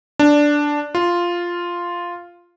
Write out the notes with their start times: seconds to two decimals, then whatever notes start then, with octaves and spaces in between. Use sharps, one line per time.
0.19 D4
0.95 F4